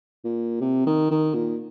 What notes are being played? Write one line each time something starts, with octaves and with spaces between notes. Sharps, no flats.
A#2
C3
D#3
D#3
A#2